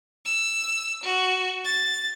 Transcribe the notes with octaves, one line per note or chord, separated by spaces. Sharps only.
E6
F#4
A6